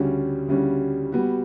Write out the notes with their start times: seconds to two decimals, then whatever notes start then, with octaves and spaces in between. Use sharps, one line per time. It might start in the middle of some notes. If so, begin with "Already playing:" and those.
Already playing: D2 C#3 G3 C#4 F#4
0.48 D2 C#3 G3 C#4 F#4
1.12 G3 B3 F#4